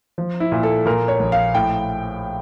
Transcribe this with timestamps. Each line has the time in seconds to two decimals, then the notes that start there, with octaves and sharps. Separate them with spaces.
0.18 F3
0.40 E4
0.52 A#2
0.63 A4
0.85 A#2 A#4
1.08 C#5
1.20 A#1
1.32 F5
1.54 A2 G5